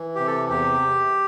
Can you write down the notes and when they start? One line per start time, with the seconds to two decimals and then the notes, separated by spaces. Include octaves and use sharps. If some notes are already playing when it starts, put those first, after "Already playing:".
Already playing: E3
0.15 C3 G4
0.27 A4
0.49 E2 G4